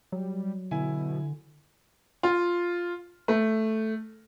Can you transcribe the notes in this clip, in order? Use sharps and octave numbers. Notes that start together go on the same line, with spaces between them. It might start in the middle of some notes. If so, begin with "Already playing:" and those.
F#3 G3
B2 D3 E4 G#5
F4
A3